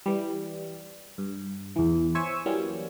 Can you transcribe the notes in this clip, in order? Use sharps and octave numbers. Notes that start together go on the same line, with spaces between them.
E3 G3
G2
E2 E3
C5 C#5 E5 G#5 C#6 E6
E3 F#3 G3 A#3 C#4